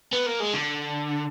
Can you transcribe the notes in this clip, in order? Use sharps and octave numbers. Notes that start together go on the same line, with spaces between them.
B3
A#3
G#3
D3